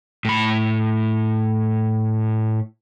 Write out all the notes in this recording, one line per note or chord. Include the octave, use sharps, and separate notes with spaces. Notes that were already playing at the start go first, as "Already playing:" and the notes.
A2 B5